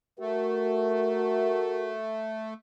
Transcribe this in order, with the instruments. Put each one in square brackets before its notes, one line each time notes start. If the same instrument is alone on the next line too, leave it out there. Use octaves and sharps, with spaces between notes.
[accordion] A3 [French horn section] F#4 A#4